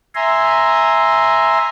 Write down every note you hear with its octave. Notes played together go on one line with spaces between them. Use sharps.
E5 G#5 A#5 C6